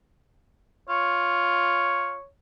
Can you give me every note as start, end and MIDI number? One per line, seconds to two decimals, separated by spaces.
0.89 2.15 65
0.89 2.26 73